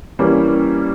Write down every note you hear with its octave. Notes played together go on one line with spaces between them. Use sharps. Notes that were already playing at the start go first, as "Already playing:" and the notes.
E3 G3 A#3 C#4